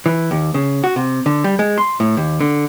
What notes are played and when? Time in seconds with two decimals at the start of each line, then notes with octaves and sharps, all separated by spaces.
0.06 E3
0.31 D#2
0.54 C#3
0.84 F#4
0.96 C3
1.26 D3
1.44 G3
1.59 G#3
1.78 C6
2.00 A2
2.17 D#2
2.40 D3